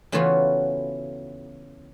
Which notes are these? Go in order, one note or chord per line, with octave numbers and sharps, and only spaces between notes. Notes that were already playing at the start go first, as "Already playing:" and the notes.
C#3 E3 A3 B3 F4 F#4